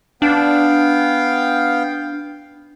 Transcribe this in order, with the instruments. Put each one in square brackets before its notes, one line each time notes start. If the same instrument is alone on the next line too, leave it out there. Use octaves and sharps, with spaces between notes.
[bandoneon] B3 F5 G5 [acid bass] D4